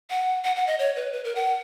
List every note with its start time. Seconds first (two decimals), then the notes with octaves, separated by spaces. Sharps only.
0.10 F#5
0.44 F#5
0.56 F#5
0.67 D#5
0.79 C#5
0.96 B4
1.13 B4
1.24 A#4
1.35 F#5